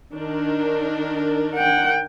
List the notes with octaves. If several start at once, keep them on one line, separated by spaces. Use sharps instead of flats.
D#3 D4 A#4
F#5 G5